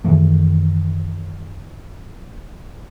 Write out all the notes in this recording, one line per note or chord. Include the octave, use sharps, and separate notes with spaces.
F#2 D#3 E3 A3